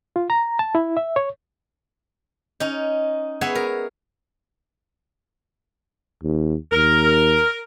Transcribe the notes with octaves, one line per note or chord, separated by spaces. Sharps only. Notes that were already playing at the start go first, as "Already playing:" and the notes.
F4
A#5
A5
E4
E5
C#5
C#4 D#4
B3 G#4 C#5 E5
A#4
D#2
D#2 A#4